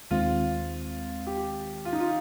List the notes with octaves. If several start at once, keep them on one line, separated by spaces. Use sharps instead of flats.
D#2 D#3 G#3 C4 F4
G4
F4
D#4
F4